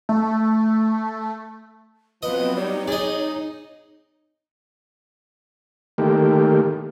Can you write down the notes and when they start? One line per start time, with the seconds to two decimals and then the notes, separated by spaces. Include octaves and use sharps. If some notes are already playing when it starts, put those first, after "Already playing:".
0.09 A3
2.23 F3 F#3 B3 C4 B4 D#5
2.56 G3 D#4 C#5
2.88 G#4 D5 D#5
5.98 D#3 A3 A#3 G4